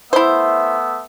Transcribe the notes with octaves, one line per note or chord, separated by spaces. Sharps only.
A3 B3 E4 C5 E5